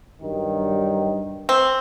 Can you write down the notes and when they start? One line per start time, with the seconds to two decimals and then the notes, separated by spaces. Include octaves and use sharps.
0.21 G2 D#3 F#3
1.49 C4